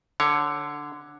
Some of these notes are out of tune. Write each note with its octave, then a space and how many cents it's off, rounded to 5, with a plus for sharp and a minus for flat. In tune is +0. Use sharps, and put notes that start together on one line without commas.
D3 +0 C#5 +0